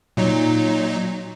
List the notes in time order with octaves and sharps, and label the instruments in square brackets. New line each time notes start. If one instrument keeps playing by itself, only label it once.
[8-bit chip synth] A#2 F#3 D#4